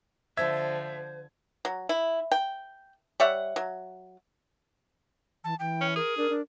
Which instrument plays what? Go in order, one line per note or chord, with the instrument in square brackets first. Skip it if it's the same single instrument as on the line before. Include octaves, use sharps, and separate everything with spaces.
[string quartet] D3 F3 [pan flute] C5 [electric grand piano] E5 G#6
[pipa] F#3
E4
G5
G3 C#5 E5 F#5
F#3
[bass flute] E3 [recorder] A5
[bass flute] E3 [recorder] G5
[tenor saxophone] C#4
[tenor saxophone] G#4 [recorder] A#4
[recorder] D4 [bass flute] A#4
[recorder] D4